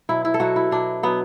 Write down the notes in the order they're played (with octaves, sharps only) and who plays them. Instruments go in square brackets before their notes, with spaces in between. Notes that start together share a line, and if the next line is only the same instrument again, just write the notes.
[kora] B2 F#3 E4
E4
A4
B2 F#3 F#4
E4
B2 F#3 D4
B2 F#3 B3